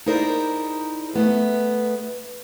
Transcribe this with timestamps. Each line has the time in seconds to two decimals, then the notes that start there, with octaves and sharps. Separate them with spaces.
0.06 D#4 E4 G#4 A#4 C5 D5
1.14 A3 B3 G#4